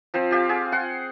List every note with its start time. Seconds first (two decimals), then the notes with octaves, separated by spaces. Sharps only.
0.14 F3 C4 C5
0.31 F4 G4 F5
0.49 F4 G#4
0.72 F#5 C6